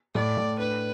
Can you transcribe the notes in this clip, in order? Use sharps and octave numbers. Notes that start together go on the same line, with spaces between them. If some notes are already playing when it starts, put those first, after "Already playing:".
A2 D5
A2
D4 B4